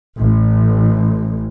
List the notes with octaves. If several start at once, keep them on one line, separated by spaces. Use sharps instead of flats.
A1